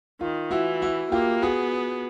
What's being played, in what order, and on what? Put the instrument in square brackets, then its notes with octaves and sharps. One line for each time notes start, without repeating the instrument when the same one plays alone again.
[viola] D#3 [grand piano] F4
[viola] E3 [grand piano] E4 F#4
[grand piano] E4 F#4
[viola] A#3 [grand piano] F4 G4
[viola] B3 [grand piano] F#4 G#4